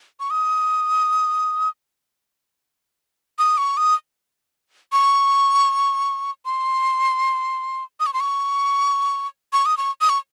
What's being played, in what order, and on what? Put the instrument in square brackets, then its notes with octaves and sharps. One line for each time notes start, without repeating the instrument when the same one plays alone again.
[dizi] C#6
D#6
D#6
C#6
D#6
C#6
C6
D#6
C#6
C6
C#6
C#6
D#6
C#6
D#6
C#6